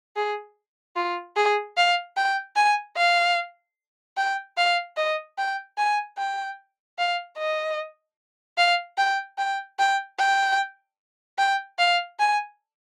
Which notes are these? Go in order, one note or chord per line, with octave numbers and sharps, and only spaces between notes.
G#4
F4
G#4
F5
G5
G#5
F5
G5
F5
D#5
G5
G#5
G5
F5
D#5
F5
G5
G5
G5
G5
G5
F5
G#5